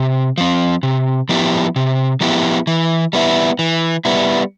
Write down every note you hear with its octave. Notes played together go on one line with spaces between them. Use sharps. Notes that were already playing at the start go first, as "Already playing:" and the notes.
Already playing: C3
F3 C4
C3
F3 B3 E4 G4
C3
F3 B3 E4 G4
E3
G3 B3 E4
E3
G3 B3 E4